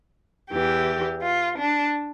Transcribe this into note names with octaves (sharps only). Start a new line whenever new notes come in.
E2 E3 G4
F4
D4